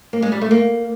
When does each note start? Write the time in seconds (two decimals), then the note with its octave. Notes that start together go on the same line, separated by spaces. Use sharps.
0.13 A#3
0.22 G#3
0.32 G3
0.41 A3
0.51 A#3